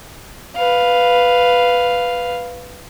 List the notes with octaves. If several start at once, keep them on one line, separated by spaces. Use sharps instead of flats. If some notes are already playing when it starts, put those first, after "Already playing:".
B4 F5